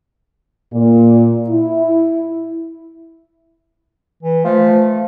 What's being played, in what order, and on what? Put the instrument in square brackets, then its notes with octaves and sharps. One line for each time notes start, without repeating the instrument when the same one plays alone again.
[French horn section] A#2
E4
[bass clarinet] E3
[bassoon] F3 [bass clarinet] A3